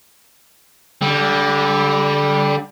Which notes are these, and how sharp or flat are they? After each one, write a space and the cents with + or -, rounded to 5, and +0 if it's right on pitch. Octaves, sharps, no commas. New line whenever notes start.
D3 -25 G3 +0